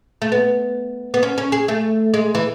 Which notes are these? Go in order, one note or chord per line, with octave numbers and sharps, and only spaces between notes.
A3
B3
B3
C#4
C#4
G#4
A3
G#3
E3